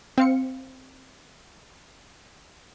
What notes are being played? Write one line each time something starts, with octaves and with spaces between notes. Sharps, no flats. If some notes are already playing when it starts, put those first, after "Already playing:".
C4 F5 C#7